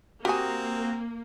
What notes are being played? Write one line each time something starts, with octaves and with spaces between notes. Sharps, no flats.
A#3 C4 F#4 G4 A#4 G#5 A#5 D#6